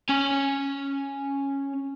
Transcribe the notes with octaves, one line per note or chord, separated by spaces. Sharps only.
C#4 G#5